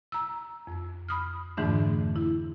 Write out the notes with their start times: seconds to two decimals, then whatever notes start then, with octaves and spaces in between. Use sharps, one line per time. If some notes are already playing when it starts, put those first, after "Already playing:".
0.12 A#5 E6
0.67 F2
1.08 B5 D#6 F6
1.57 F2 G#2 D3 E3 A3 D4
2.16 E4